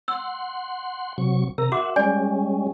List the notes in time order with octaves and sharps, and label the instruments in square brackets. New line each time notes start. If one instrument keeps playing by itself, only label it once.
[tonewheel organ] F#5 C6 [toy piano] E6
[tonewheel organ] C3 F#3 C#6
[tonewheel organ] C3 A#5 [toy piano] A#4
[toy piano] F#4 D6 [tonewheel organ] E5 F#5
[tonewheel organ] G3 G#3 C#4 [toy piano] D5 G#5